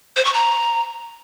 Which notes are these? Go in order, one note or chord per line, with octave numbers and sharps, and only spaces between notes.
C5
C#6
A#5